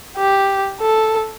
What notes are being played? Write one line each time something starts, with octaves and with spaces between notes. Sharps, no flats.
G4
A4